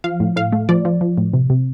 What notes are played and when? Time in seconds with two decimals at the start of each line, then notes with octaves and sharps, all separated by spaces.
0.04 F3 F5
0.20 A2
0.36 A2 F5
0.52 A3
0.69 F3 D5
0.85 F3
1.01 F3
1.18 A2
1.34 C3
1.50 C3